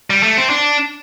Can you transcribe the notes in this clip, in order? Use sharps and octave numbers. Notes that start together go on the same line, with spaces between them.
G3
A3
C4
D4